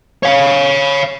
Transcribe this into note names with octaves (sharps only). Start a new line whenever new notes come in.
C#5 F5